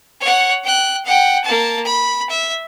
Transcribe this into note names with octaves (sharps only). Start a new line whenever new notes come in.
C#5 F#5
G5 F#6
F#5 G5
A#3 A5
B5
E5